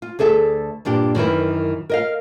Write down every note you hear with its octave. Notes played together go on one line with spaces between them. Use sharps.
F4
D2 G#4 A4 E5
G2 A#2 D4 G4
F#2 D#3 E3 E4
A#4 D#5 F5